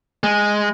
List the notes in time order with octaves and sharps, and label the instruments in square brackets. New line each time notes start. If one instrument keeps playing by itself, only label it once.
[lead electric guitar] G#3